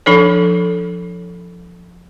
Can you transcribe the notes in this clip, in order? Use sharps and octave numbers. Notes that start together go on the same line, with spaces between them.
F3 D4 A4 C#5